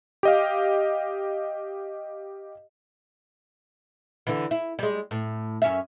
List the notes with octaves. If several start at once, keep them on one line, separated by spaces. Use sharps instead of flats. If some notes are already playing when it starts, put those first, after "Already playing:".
G4 D#5 F5
D3 E3
E4
G3 G#3
A2
F#2 C#4 E5